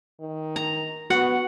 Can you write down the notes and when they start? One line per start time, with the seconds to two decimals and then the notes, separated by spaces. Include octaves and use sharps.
0.20 D#3
0.56 A#5
1.10 B3 F#4 F#5